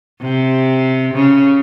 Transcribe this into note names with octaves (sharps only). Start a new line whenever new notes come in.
C3
C#3